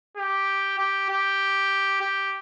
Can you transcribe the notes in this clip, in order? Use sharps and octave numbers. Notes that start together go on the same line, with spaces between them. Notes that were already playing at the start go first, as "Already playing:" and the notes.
G4
G4
G4
G4